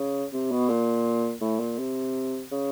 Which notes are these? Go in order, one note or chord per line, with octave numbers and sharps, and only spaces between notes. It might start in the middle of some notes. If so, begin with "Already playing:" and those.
Already playing: C#3
C3
B2
A#2
A2
A#2
C3
C#3